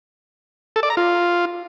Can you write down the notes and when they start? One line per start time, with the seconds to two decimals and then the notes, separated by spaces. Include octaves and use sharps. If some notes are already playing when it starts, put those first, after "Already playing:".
0.76 A4
0.83 D5
0.90 A#5
0.97 F4